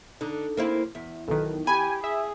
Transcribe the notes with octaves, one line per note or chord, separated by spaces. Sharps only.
D3 D4 D#4
A#3 C4 E4
E2 E5
B1 D#3 A4 B4
G4 G#5 B5
G#4 E5